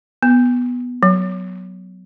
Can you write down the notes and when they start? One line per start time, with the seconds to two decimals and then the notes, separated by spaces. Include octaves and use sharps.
0.23 B3
1.03 F#3